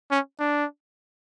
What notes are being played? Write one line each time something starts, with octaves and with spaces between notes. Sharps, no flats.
C#4
D4